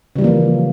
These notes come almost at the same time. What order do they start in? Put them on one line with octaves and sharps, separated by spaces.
C#3 G3 E3 A#3 F3